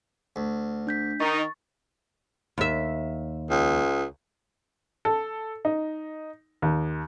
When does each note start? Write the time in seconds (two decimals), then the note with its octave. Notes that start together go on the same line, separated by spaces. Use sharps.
0.36 D2
0.87 D4 G6 B6
1.20 D#3 D#4 C#6 A6
2.58 D#2 E5
3.50 C#2
5.05 A4
5.65 D#4
6.62 D#2